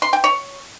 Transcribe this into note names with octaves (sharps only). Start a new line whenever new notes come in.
C6
G5
C#5